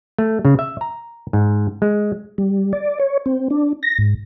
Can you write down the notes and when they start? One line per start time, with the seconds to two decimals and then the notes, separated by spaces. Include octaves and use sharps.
0.19 A3
0.45 C#3
0.59 E5
0.81 A#5
1.33 G#2
1.82 G#3
2.38 G3
2.73 D5
2.99 C#5
3.26 C4
3.50 D4
3.83 A#6
3.99 G#2